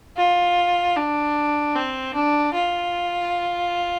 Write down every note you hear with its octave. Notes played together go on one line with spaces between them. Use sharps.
F4
D4
C4
D4
F4